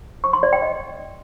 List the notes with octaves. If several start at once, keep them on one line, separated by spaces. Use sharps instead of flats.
C#6
C6
D5
G5
D#5